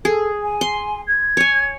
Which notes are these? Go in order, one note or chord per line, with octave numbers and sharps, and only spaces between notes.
G#4 A4
G#5
C6
G#6
C#5 G#5